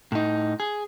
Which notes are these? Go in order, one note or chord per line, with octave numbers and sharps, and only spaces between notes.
A2 D#4
G#4